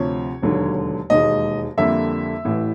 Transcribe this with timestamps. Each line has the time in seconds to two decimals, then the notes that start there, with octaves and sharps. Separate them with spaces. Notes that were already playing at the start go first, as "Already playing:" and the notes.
Already playing: D2 C3 F3 C#5
0.42 E1 D#2 D3 F#3
1.10 E1 D#2 D#3 G#3 D#5
1.77 F2 D3 G3 A#3 E5
2.45 A1 A2 E3